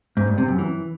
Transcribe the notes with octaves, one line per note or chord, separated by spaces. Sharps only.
G#2
G2
C3
F#2
E3